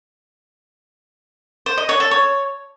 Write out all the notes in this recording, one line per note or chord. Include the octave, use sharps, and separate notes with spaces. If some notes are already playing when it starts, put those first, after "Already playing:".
C5
D#5
C#5
A4
C#5